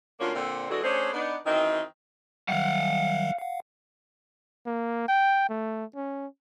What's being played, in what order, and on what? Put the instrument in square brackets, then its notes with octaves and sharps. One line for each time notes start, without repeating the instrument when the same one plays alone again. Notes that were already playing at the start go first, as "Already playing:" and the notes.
[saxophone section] D2 D3 A#3 C#4 F4
A#2 D3 C4
E3 G#3 A3 D4 F#4 A4
A3 C#4 D4 G#4 C5
B3 D4 D#4
F#2 D#3 E3 C4 D#5
[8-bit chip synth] D#3 F#3 G3 [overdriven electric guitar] F5 F#5
[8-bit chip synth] F5 F#5
[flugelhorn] A#3
G5
A3
C#4